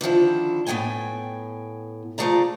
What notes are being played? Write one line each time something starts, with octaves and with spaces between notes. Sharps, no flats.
D3 D#3 F3 E4
A2 B3 D#4 G5 G#5
F3 F#3 A3 G#4 D5 A#5